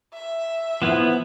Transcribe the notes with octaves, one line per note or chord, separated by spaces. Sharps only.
E5
F3 B3 E4